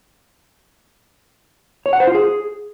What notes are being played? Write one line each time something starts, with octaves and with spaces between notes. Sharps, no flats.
C#5
F#5
C5
F4
G#4